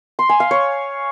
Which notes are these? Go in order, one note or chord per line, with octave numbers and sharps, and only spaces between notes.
C6
G#5
F5
C#5